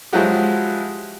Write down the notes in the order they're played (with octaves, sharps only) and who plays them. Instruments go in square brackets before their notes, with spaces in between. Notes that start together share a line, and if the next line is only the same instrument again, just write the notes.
[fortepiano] F3 F#3 G#3 E4 F#4 G4